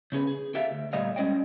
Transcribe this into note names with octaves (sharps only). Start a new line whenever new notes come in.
C#3 C#4 G#4 B4
G#4
G4 A4 E5 F5
D2
A#2 G3 A3 D#5 F5
G3 G#3 C#4 D5 D#5 G5